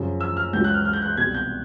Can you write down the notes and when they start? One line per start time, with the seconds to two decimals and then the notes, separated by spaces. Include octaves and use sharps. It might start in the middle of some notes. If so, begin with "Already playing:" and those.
Already playing: F#2 C#3 F3
0.21 E6
0.37 F6
0.53 C#2 C#3 F#3 G6
0.64 F#6
0.74 F6
0.85 F6
0.93 G6
1.02 F#6
1.09 G6
1.17 C2 B2 G3 G#6
1.34 G6